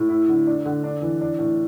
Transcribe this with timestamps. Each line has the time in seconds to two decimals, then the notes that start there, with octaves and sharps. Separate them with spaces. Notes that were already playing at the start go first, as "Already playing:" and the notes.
Already playing: A2
0.09 E4
0.28 D3
0.47 D4
0.65 D3
0.84 D4
1.02 E3
1.21 D4
1.39 A2